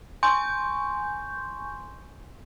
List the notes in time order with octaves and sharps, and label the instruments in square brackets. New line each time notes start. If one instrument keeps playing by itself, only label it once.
[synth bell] G#5 C6 C#6 G6